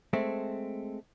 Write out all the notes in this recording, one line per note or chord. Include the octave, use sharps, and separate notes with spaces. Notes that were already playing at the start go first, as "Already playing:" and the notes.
G#3 A3 C4